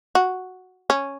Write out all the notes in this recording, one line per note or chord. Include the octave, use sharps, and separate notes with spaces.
F#4
C#4